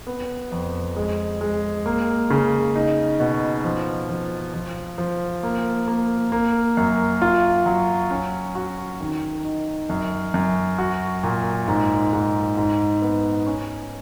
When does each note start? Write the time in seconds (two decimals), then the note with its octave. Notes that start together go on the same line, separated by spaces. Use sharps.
0.07 B3
0.52 F2
0.96 G#3
1.41 G#3
1.86 A#3
2.30 C#3
2.76 D#4
3.20 B2
3.64 F3
4.09 F3
4.54 F3
4.98 F3
5.43 A#3
5.88 A#3
6.32 A#3
6.77 F#2
7.22 F4
7.66 F#3
8.11 C#4
8.55 F#4
9.00 D#3
9.45 D#4
9.90 F#2
10.34 F#2
10.78 F#4
11.23 A#2
11.68 G#2
12.13 G#2
12.57 G#2
13.02 B3
13.46 C#4